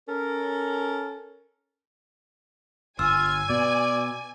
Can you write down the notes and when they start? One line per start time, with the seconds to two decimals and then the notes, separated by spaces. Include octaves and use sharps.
0.09 C#4 A4 A#4
2.99 G1 F4 G#5 E6
3.50 B2 D5